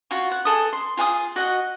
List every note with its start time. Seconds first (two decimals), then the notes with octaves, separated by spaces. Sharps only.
0.11 F4 F#4
0.31 F#5
0.45 G#4 A4 D#6
0.73 C6
0.97 F4 G#4 F#5 D#6
1.36 F#4 D#5 F#5